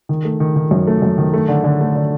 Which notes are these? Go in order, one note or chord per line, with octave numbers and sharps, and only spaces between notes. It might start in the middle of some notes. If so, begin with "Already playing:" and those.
D#3
A3
D#3
D#3
F#2
A3
F#2
D#3
A3
D3
D3
A3
D3